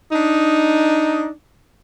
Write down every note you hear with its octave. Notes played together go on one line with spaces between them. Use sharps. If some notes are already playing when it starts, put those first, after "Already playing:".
D4 D#4